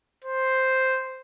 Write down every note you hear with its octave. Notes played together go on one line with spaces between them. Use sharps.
C5